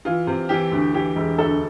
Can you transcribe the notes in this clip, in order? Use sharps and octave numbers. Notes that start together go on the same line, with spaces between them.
E3 F4
C3
E3 G4
D2
E3 G4
E1
D2 A4